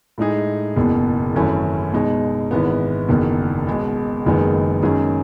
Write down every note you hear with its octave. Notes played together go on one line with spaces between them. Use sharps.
A2 G#3 D#4 G#4
F#1 E2 B2
G#1 F#2 E3 A3 C#4
B2 G#3 D#4
G#1 G#2 E3 B3
F#1 E2 D#3
B1 B2 G#3
F#1 F#2 D#3 G#3 B3
F#2 D#3 G#3 C#4 G#4